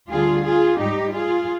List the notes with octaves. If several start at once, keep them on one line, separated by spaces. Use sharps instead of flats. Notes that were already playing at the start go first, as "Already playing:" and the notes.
D2 D3 G3 F4 G#4
F4 G#4
G#2 G3 D#4 G4
F4 G#4